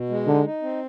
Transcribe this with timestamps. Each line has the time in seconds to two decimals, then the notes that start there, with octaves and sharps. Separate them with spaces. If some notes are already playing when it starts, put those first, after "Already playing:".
Already playing: B2
0.09 G#3
0.27 D3 D#4
0.44 D#4
0.62 C4